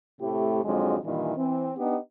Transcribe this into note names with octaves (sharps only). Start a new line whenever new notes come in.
A2 C3 A3 E4 G4
F2 G#2 D3 F#3 G#3
G2 A#2 D#3 E3
E3 C4
B3 D4 D#4 G4